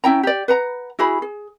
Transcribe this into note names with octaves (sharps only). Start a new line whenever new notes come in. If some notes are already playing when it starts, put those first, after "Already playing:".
C#4 E4 G5 A#5
G4 D5
B4 F#5 A#5
E4 F#4 G#4 B5
G#4